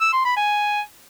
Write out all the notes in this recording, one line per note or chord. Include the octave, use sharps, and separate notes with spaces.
E6
C6
B5
G#5